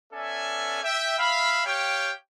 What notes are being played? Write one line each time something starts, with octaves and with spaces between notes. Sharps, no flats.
B3 C#4 A4 D5 E5 G#5
E5 G5
E5 F5 B5
G4 C#5 F5 G5